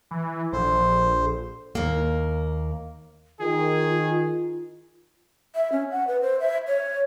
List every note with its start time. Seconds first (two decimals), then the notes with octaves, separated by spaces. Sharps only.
0.11 E3
0.53 A#1 A4 C5
1.75 D#2 A#3
3.40 D#3 F4 G#4
5.55 E5
5.72 C#4
5.91 F#5
6.08 B4
6.22 C5
6.40 E5
6.67 C#5